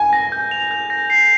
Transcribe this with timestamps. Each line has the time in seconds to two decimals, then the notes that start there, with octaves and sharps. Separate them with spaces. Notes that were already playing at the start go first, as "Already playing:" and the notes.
Already playing: G#5
0.13 A#6
0.32 G6
0.51 F7
0.71 G6
0.90 A#6
1.10 C7